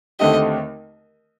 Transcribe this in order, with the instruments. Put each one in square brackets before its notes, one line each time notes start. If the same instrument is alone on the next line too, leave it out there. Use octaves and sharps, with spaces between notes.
[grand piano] D#2 D3 A3 C4 G4 [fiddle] D#5